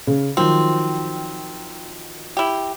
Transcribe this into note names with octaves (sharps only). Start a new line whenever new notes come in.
C#3
D#3 F3 F#3 C4
E4 G4